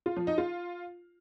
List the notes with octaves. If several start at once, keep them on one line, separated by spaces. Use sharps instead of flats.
F4
F3
D#4
F4